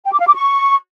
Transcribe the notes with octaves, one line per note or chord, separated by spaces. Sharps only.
G5
D6
F5
D6
C#6